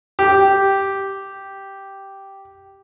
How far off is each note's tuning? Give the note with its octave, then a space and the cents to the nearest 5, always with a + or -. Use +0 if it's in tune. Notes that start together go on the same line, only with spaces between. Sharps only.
G4 -5